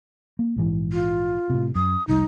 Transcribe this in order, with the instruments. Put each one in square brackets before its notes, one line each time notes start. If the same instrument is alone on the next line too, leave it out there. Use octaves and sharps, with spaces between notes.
[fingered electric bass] A#3
A#1 G#2 E3
[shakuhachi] F4
[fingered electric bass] A2 C3
[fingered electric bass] F#2 [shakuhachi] D#6
[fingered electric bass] F1 C2 G3 [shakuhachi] D#4